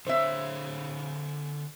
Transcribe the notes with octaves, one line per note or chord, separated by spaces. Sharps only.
D3 C5 C#5 E5